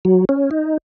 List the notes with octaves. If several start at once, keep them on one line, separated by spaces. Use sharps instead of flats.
F#3
C#4
D#4